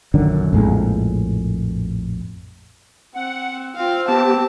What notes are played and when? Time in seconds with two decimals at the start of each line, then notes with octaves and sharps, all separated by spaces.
0.14 A#1 F#2 D3 D#3
0.53 A#1 F2 A2 G#3
3.15 C4 F#5
3.76 C4 F4 F5
4.08 B3 G4 A5